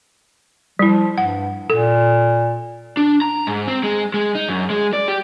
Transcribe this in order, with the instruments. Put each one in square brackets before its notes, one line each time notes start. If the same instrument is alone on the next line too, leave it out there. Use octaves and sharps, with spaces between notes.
[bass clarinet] F3 [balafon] G3 E4
[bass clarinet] G2 [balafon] F#5
[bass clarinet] A#2 [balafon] A4
[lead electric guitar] D4
A#5
G#2
C4
G#3
G#3
D#4
F#2
G#3
D5
G4